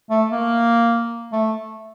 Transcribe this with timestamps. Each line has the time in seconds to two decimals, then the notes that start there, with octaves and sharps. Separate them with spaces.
0.10 A3
0.31 A#3
1.32 A3